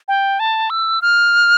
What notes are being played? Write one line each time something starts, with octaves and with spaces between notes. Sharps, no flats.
G5
A5
E6
F6